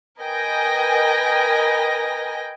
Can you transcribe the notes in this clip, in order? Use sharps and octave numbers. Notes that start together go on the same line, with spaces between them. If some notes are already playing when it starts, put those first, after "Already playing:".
A#4 B4 D#5 G5 G#5 A#6